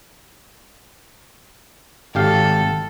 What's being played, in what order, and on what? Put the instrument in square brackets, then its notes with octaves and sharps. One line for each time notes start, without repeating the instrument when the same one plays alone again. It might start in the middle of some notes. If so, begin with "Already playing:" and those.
[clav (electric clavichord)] G#1 G4 F5 [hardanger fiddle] A4